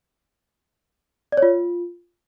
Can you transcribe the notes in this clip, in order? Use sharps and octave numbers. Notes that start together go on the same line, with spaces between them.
D5
C#5
F4